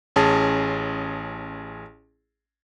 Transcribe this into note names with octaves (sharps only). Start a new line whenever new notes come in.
A1 C#4 G#4 A5